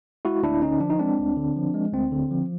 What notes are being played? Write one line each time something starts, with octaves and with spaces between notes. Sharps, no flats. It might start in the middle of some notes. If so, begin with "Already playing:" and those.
G#3 E4 F#4
D2 D4 E4
D3 C#4 D#4
F3 D4
D#4
G#3 C4 D4
D2
D3
F3
G#3
D2 C4
D3
F3